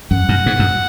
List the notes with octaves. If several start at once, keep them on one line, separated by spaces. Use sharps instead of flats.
F#2 F#5
F#2
G#2
F#2